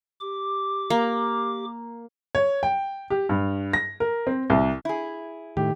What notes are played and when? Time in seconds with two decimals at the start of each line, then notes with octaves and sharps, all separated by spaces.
0.21 G4 D6
0.90 A#3
2.35 C#5
2.63 G5
3.10 G4
3.29 G2
3.73 A#6
4.00 A#4
4.27 C4
4.50 C2
4.85 E4 G#4
5.57 A2 D#3 G4